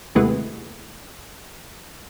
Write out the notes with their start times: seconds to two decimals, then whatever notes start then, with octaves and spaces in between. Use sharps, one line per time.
0.15 D#2 C3 E3 G#3 A3 B3